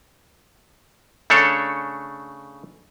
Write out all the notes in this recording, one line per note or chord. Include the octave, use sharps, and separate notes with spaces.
C#3 A3 D4 A4 C#5